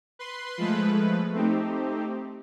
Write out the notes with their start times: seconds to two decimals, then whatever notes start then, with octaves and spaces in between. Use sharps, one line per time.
0.19 B4 C6
0.58 F3 G#3 A3 B4
1.34 A3 C4 D#4 G4